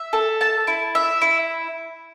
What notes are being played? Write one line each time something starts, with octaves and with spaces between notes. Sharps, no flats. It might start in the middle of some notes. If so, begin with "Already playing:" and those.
Already playing: E5
A4
A5
E4
E5
E4